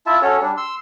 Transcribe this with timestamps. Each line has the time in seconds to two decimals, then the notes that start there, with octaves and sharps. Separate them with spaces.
0.06 E4 F4 E5 A5
0.22 C#4 F#4 A4 C#5
0.42 G3 D4
0.57 C6 E6